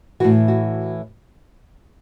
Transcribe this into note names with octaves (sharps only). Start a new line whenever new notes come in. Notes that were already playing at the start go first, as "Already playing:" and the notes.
A2 E3 F#4
F#4